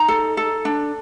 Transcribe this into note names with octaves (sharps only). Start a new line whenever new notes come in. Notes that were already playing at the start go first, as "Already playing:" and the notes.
Already playing: D#4 A#5
A4
A4
D4